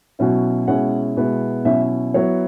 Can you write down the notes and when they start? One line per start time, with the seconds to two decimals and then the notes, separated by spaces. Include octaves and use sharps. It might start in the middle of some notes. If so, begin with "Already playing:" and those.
0.19 B2 F#3 C#4 E4
0.68 B2 G#3 C#4 E4 F#5
1.17 B2 G#3 B3 E4
1.65 B2 F#3 C#4 E4 E5
2.14 F#3 B3 E4 C#5